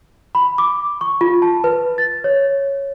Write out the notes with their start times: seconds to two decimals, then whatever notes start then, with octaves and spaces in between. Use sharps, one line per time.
0.35 B5
0.58 D6
1.01 C#6
1.21 F4
1.42 A5
1.64 B4
1.98 A6
2.24 C#5